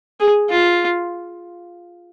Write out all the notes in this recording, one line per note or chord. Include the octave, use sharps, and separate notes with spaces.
G#4
F4